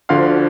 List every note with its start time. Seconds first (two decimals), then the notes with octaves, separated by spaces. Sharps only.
0.09 D2 D3 F3 F5